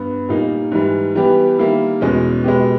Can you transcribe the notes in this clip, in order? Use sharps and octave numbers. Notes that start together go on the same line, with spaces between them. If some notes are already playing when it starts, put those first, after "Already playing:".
Already playing: G2 B3
A#2 G3 A#3 D#4
G#2 E3 G3
E3 G3 B3 G4
D#3 G3 A#3 E4
E2 B2 G#3 C#4
B2 G#3 B3 G4